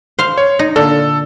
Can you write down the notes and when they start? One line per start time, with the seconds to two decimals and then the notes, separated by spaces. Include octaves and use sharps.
0.19 C5 F5
0.37 C#5
0.59 D#4
0.76 A#2 D3 A#3 A4